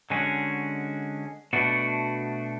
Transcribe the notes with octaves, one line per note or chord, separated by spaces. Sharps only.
D3 G#3 C#4 F#4
B2 A3 D4 F#4